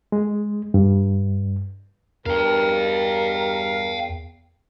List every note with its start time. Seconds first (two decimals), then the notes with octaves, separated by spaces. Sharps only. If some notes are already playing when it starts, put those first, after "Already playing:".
0.12 G#3
0.74 G2
2.26 E2 G2 A#4 F5 G5